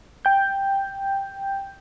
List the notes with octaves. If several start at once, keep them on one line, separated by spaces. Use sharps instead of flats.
G5 G6